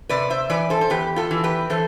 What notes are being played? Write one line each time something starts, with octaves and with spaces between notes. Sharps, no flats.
C3 B4 D5
C5 E5
E3 B4 D5
A4 C5
C5
E2 G4 B4
F4 A4
E3
G4 B4
E3 A4 C5